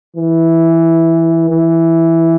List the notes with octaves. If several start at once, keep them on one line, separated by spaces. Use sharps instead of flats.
E3
E3